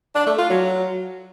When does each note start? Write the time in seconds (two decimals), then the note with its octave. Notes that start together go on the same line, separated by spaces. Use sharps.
0.15 D4
0.27 A3
0.39 F4
0.50 F#3